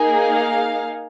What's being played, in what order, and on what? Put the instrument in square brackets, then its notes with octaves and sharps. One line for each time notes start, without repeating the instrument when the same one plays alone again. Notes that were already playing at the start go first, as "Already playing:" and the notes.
Already playing: [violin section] A#3 D#4 G#4
F5